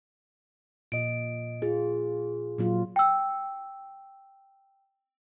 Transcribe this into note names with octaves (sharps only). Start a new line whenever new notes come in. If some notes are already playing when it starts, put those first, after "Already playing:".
A#2 D#5 D7
F4 G#4
A#2 F#3 F4
G5 E6